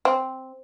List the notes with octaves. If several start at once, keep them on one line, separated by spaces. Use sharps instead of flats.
C4